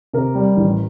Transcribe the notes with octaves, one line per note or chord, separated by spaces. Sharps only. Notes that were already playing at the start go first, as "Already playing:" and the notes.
C3 A#4
G3
A1